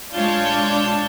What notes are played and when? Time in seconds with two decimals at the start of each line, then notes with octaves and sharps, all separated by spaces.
0.13 G#3 D4 F4 C#5 A5 G6